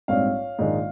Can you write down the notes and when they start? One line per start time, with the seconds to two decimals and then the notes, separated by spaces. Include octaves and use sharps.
0.08 A#1 G#2 G3 C4 C#5 F5
0.59 A#1 G#2 D#3 G#3